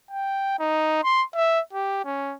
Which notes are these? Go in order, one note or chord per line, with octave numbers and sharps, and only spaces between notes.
G5
D#4
C6
E5
G4
C#4